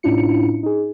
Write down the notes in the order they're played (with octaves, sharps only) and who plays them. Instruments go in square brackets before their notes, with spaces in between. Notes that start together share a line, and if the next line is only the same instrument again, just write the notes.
[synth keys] A2 C#4 D4 E4 F4 C#7
D#4 G#4